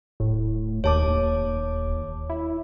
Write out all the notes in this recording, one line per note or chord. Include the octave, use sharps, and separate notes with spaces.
D1 A2
D#2 C#5 A5 D6
D#2
E4